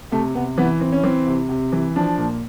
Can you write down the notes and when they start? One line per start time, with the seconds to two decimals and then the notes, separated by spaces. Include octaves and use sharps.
0.12 C3 A3
0.35 C3 B3
0.58 E3 B3
0.80 E3 C4
0.93 C#4
1.04 E3 C4
1.27 C3
1.49 C3
1.72 E3
1.96 F3 D4
2.18 A#2